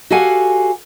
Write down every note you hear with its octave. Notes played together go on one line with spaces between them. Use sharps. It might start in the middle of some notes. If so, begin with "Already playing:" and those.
F#4 G4 A4 F5 F#5 G#5